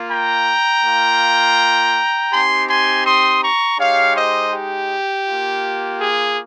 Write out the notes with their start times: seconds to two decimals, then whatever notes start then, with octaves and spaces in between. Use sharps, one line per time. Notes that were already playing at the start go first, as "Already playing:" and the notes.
Already playing: A#3 F4
0.10 G5 A#5
0.84 A#3 F4
2.32 C4 D#4 G4 G#5 C6
2.69 G#5 C6
3.05 C6 D#6
3.43 A#5 C#6
3.79 G#3 D#4 G4 C#5 F5
4.16 C5 D#5
4.53 G4
5.27 A#3 F4
6.00 G#4